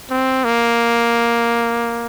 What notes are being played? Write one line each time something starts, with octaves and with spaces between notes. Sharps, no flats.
C4
A#3